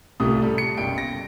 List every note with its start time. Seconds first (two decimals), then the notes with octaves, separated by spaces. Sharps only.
0.20 C2 A2 F4 G4 D#6
0.42 G3 A4
0.58 C#7
0.77 F#1 B1 G3 G5 D7
0.98 A#6